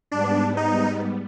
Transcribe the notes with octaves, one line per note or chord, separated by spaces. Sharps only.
G#2 G3 B3 D4
D#4